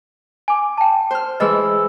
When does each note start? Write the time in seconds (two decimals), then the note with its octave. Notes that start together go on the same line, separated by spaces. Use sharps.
0.48 G#5 D6
0.78 G5 A5
1.11 C5 F6
1.40 E3 G#3 G#4 B4 D#5 E6